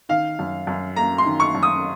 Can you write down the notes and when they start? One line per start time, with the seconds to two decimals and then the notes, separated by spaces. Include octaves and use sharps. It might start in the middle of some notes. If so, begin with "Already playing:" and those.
0.09 D#3 F5
0.39 F#2
0.67 F#2
0.96 A#3 A#5
1.18 C6
1.26 D#3
1.40 C#6
1.55 F#2
1.63 D#6